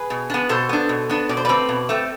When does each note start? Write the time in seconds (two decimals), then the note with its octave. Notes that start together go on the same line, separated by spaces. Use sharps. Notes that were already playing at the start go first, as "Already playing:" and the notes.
Already playing: G#4 B4
0.10 B2
0.30 B3 D4
0.49 B2 A4 C5
0.69 B3 D4
0.89 B2
1.09 B3 D4
1.29 B2 D5
1.37 C5
1.45 A3 C4 B4 D5
1.69 B2
1.89 A3 C4